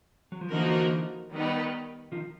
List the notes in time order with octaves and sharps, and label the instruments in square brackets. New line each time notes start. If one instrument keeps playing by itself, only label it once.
[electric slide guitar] F#3
F3
[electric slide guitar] D3 E3 [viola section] F3 A#3 D#4 F#4 A#4
[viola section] D#3 G3 B3 D#4
[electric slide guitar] D#3 F3